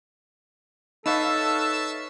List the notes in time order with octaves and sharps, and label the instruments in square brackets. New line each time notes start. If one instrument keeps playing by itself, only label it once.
[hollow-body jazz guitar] D#4 [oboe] A4 [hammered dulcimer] B4 C#5 F5 [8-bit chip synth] E5 A5 E6